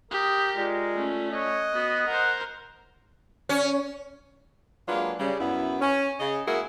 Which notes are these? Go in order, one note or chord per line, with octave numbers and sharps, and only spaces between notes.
G4 A#4 D#6
G#3 F4 D5
A3 C#4
C#5 D#5 F#6
B3 F#4
A#4 C5 F#5
C#4
F#3 G#3 A#3 D4 F4 B4
C#3 G3
F#2 B3 E4
C#4
C#3 D#5
G#3 A#3 E4 F#4 G#4 A#4